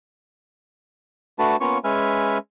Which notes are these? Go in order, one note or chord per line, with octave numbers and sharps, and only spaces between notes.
A3 D4 F#4 B4 A5
A#3 B3 C#4 F4 C#5 C#6
G#3 C#4 B4 E5 G#5 F6